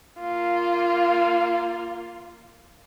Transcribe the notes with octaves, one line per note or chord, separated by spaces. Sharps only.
A#3 F4